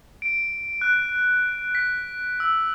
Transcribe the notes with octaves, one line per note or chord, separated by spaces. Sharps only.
D7
F#6
B6
E6